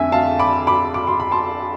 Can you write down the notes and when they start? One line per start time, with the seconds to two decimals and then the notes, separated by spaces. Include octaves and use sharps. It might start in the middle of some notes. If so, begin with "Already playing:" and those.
Already playing: F2 D3 A3 E5 G#5
0.12 F5 A5
0.39 B5 D6
0.67 B5 D6
0.94 D6
1.07 C6
1.20 B5
1.31 A5 C6